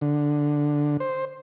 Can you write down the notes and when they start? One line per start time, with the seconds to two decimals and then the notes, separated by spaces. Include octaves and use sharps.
0.01 D3
1.00 C5